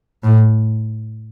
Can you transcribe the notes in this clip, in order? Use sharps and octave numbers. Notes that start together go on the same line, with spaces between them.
A2